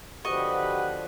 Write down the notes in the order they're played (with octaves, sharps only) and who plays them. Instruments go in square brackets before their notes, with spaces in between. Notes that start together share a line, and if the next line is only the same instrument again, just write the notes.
[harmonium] D3 F3 [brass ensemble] F#4 G4 B4 [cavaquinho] D#5 C#6